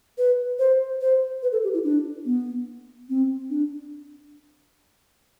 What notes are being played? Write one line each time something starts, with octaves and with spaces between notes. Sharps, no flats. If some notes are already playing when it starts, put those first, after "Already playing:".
B4
C5
C5
B4
A4
G4
E4
D4
B3
C4
D4